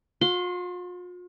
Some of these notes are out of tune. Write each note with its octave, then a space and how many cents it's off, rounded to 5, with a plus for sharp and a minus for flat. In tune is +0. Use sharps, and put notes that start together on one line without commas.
F4 +45 C6 -15